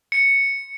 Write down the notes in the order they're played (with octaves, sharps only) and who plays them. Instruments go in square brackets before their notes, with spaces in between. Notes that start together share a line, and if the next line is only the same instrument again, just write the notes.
[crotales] C#7